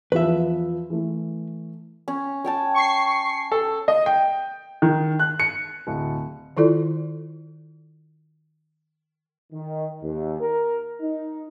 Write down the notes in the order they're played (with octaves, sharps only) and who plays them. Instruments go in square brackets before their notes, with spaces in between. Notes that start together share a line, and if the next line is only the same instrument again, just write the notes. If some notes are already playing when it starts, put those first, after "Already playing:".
[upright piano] E2 F3 [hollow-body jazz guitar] B4 E5
[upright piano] E3 A3
[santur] C#4
C#5 G5 A5
[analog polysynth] C#6 C7
[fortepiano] A4
[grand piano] D#5
G5
D#3
F#6
C#7
D1
[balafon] D#3 E4 F4 A4 D5
[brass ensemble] D#3
D#2
A#4
D#4